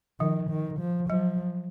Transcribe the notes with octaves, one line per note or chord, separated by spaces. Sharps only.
D#3 F3
D#3
F3
F3 F#3